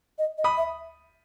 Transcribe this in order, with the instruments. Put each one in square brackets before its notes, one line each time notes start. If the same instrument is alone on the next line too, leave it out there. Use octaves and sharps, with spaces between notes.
[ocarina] D#5
D#5
[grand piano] B5 D#6
[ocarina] E5